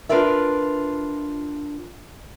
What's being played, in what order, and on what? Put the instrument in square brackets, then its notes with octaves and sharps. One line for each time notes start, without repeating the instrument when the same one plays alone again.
[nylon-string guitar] D4 F4 A#4 B4 D5 E5